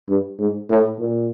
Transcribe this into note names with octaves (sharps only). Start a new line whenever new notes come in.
G2
G#2
A2
A#2